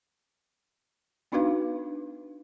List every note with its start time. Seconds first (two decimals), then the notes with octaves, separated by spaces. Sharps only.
1.32 B3 D4 D#4 F#4 B4 F5